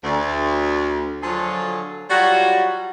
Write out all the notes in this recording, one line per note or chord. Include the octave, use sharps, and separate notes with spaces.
D2
D3 F3 F#3 F4 G#4 A4
F#3 G3 F4 F#4